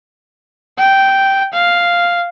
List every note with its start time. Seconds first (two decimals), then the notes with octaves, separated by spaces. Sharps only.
0.79 G5
1.54 F5